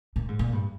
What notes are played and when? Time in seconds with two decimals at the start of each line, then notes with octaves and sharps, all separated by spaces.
0.16 A#2
0.28 G#2
0.39 A#2
0.53 G2